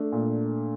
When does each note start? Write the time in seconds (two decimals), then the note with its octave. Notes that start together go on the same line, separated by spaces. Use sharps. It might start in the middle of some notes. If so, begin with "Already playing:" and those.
Already playing: A3 D4
0.12 A#2